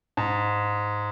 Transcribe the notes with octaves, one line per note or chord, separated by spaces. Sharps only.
G#2